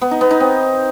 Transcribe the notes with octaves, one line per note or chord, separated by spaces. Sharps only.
B3
D#4
B3
D#4
C4